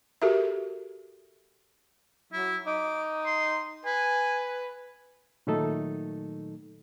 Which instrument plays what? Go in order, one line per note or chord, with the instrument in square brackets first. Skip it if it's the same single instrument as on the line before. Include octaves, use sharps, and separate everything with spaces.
[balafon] F#4 G4 A4 A#4 E5
[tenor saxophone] F#3 [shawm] E4
[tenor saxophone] D#4 [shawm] D6
[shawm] C6
[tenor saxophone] B4 [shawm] G#5
[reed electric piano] A#2 D#3 F#3 A3 D#4 A4